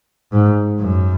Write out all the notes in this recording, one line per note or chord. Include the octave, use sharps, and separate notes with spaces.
G#2
F#2